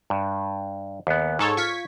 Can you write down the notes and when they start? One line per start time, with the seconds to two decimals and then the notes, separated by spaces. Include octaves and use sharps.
0.10 G2
1.07 D#2 B3
1.39 G#2 A4 C#5
1.57 F4 C#6 G#6 B6